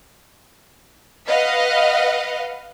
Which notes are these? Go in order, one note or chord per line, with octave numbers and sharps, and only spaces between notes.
B4 D#5 F5 F#5